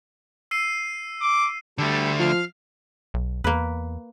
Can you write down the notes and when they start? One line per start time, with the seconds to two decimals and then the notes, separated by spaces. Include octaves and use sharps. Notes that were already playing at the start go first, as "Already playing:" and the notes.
0.51 E6 C7 D#7
1.21 D6
1.78 D3 G3 A3 A4
2.20 F3 F5 F6
3.14 B1
3.44 E2 A#3 B4